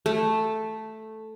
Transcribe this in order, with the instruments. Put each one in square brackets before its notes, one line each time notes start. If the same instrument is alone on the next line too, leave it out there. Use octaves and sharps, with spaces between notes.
[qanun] A3